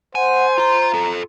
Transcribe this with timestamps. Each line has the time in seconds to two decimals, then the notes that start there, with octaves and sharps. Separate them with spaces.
0.15 C5 F#5 G#5
0.58 F4 A#5 C6
0.93 F4 A4